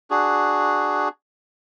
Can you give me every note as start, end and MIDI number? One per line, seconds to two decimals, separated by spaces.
0.10 1.08 62
0.10 1.08 66
0.10 1.08 68